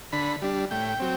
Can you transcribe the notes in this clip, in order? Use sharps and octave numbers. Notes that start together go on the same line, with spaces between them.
D3 B5
G3 D4
A2 G5
F#3 C4